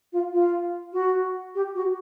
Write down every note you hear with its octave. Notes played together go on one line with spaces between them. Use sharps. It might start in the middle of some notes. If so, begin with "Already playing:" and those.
F4
F4
F#4
G4
F#4